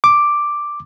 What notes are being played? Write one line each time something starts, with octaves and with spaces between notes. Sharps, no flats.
D6